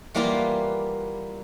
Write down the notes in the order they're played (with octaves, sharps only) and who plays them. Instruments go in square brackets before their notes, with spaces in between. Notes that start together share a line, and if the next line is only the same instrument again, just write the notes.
[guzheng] E3 G3 A#3 B3 F4